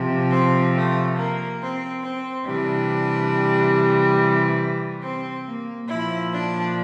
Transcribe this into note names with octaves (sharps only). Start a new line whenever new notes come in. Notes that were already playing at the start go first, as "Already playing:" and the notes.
Already playing: C3 F3
C4
A3
A#3
C4
C4
C3 E3 G3 D4
C4
A#3
A#2 F3 E4
D4